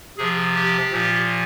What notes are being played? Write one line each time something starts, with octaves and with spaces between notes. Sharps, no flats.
C3 F3 G#4
G4
A#2 F3